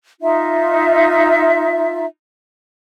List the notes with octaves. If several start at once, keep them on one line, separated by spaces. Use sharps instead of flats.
D#4 F4 E5